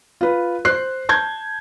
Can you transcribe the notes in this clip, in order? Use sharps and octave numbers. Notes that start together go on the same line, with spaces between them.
F4 B4
C5 F#6 C7
A5 G6 G#6